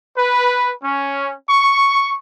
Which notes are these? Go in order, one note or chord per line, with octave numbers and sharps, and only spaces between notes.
B4
C#4
C#6